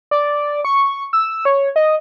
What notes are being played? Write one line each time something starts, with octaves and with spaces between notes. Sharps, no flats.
D5
C#6
E6
C#5
D#5